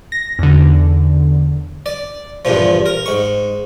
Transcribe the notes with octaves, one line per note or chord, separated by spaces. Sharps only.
A#6
E2 D3
D5
E2 G2 A#2 F3
A#4
G#2 C#6